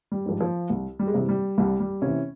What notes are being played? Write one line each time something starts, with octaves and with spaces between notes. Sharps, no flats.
G3
G#2 F3
F3
C2
G3
G#3
C3 E3 G3
G3
C2 G3
G3
C3 E3 C#4